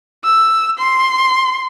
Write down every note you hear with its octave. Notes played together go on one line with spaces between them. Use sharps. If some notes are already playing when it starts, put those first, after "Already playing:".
E6
C6